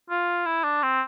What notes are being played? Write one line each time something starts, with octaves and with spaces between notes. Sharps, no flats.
F4
E4
D4
C4